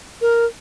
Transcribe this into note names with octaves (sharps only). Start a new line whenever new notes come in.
A#4